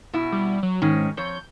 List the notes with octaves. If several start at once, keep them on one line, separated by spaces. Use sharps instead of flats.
B2 E4
G3
F#3
G#2 D#3 C#4
F2 C#5 G6